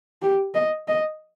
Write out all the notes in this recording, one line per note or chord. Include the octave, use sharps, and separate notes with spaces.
G4
D#5
D#5